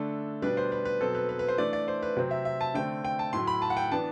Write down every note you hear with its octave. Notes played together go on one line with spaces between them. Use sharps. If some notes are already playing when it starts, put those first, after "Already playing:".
Already playing: D3 A3 D4 A4
B2 G3 D4 B4
C5
B4
B4
B2 F#3 C4 A4
B4
B4
B4
C5
E3 A3 D4 D5
D5
C5
B4
C3 F#3 C4
E5
E5
A5
D3 A3 C4 G5
G5
A5
A2 F#3 A3 C6
B5
A5
F#5
G5
E3 B3 D4 A5